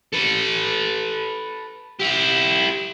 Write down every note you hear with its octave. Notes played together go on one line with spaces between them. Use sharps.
A4 B4
E4 G4